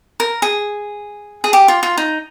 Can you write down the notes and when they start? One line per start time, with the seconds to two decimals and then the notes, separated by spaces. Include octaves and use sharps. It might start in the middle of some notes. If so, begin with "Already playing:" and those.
0.20 A#4
0.42 G#4
1.44 G#4
1.53 G4
1.68 F4
1.83 F4
1.97 D#4